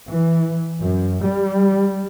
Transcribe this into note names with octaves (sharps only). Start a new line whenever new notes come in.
E3
F#2
G3